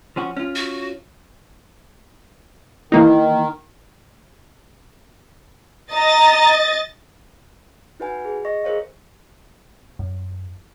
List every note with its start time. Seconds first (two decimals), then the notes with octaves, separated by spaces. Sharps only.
0.16 F3 C#4 F#4
0.37 C#4 F4
0.55 F#4
2.92 D#3 E3 A#3 D#4
5.92 D#5 A#5 A6
8.00 D#4 F#4 B4 F#5 G#5
8.25 G#4
8.45 D#5 C#6 A#6
8.64 G#4 A#4 C5 C#5 F5
9.99 F#2